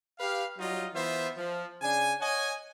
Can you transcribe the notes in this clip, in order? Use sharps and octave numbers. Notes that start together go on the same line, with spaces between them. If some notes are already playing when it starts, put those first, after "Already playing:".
G4 B4 F5
F#3 G3 D#4 F4 D#5
E3 B3 F4 C5 E5
F3
C#3 D4 G#5
C#5 D#5 F#5 G#5